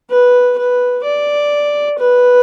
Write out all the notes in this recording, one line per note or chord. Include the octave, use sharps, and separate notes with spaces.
B4
B4
D5
B4